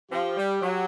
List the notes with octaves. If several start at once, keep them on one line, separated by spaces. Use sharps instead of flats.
F3 C4 G4
G3
F#3